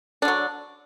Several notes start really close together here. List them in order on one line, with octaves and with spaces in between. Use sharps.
D4 D3 F#3